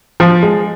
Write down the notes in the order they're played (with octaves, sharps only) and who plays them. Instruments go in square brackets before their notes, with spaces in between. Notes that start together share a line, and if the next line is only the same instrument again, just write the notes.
[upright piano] F3
G#3